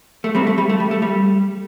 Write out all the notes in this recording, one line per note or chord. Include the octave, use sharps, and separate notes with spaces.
A3
G3 C4
A3
G3
A3
G3
A3
G3